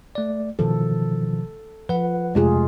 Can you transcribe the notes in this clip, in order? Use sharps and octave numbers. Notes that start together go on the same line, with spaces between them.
A3 D5
B2 D#3 F3 A4
F3 B4 F#5
F2 C3 G#3 A3 F4 G#4